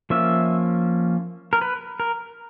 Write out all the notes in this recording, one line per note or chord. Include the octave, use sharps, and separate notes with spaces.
F3 A#3 C#4 E5
A#4
B4
A#4